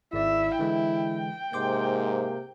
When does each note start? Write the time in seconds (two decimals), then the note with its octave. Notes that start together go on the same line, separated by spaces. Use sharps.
0.13 G#1 E4 D5 E5
0.59 D3 E3 G#3 G5
1.53 G#2 C3 A#3 C6 D6 G6